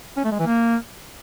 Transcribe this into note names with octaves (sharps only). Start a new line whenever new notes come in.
C#4
A3
G#3
E3
A#3